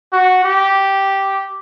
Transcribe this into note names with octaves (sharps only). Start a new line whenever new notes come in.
F#4
G4